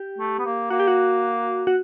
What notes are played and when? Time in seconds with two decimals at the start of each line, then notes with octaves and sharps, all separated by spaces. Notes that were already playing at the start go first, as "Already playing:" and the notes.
Already playing: G4
0.19 A3
0.39 B3
0.46 A#3
0.70 A#3 F#4
0.80 G4
0.88 F#4
1.67 F#4